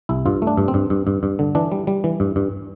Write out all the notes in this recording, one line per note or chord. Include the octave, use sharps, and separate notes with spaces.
C2 E4
G2 F4
A3
D4
G2
C4
G2
G2
G2
G2
D3
E3 D4
G3
G3
E3
G2
G2